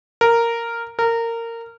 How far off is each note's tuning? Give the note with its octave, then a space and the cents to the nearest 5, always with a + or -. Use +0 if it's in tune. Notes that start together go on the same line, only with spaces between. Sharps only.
A#4 -5
A#4 -20